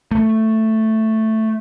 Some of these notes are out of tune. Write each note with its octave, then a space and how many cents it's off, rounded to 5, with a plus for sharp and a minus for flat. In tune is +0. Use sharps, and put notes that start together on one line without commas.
A3 +5